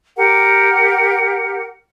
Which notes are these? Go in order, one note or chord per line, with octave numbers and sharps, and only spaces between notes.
G4 A#4 F#5